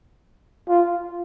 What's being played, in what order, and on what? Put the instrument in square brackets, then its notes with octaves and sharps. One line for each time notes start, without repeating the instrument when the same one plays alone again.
[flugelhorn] F4